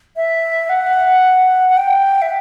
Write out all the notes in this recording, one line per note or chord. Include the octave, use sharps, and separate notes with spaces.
E5
F#5
F#5
G5
E5